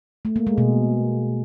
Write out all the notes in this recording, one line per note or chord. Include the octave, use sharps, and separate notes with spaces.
A3
A#3
G#3
B2